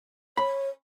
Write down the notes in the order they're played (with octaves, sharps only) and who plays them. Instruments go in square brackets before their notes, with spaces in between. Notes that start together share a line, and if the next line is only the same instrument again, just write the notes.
[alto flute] C#5 [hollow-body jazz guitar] B5